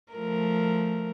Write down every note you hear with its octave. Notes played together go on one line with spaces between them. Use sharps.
F3 A3 A#4